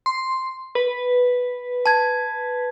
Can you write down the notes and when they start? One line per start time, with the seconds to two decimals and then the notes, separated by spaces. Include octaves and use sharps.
0.06 C6
0.75 B4
1.86 A5 G#6